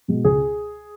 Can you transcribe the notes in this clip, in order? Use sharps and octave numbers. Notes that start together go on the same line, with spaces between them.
B2 G#3
C#2 G#4